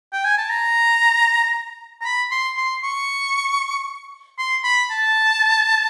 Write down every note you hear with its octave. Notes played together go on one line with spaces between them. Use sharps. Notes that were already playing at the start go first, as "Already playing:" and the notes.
G5
G#5
A5
A#5
A#5
B5
C6
C6
C#6
C6
B5
A5